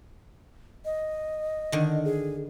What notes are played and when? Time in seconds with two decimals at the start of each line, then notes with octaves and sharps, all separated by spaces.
0.85 D#5
1.72 D3 D#3
2.05 G#4